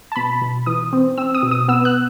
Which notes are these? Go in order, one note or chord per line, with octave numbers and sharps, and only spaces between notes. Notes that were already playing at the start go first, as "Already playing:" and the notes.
A5
B2 B5
B2
E3 D#6
C4
C4 E6
D#6
B2
D#6
B3 E6
F#6